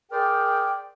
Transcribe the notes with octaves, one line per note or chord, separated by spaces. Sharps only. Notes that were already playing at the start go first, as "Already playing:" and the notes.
G#4 A#4 C5 D5 G5